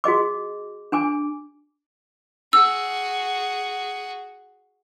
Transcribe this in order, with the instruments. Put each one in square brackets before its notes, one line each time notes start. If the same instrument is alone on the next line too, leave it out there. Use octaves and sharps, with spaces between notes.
[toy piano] F#4 G#4 D#5 D6
D4 G#5 D6
[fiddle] F#4 G#4 [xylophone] E6